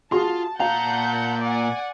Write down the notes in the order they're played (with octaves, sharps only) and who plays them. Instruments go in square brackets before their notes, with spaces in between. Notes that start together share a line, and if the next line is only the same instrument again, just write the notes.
[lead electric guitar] F4 [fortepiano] F#4 G#4 C6 [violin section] A5
[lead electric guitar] A#2 A#5 [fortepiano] F5 [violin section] F#5 A5 G6
[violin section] D5 F#5 G#5